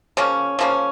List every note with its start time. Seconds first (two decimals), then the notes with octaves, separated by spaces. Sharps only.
0.17 C#3 F3 A#3 C#4
0.59 C#3 F3 A#3 C#4